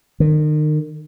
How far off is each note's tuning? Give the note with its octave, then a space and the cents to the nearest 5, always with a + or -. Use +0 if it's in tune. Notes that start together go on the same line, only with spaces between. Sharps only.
D#3 -35